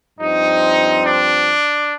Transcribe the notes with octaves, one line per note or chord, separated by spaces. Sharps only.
G2 F3 C4 D#4
D4